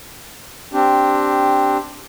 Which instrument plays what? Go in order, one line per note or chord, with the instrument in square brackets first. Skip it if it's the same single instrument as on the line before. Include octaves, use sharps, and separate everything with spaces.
[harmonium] C4 D4 G4